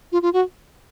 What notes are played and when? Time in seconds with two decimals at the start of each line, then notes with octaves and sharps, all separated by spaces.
0.12 F4
0.22 F4
0.33 F#4